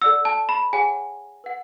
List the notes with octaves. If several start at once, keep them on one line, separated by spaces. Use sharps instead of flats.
A4 D5 F#5 E6
A5
B5
G#4 C#5 F#5 G#5
B4 F#5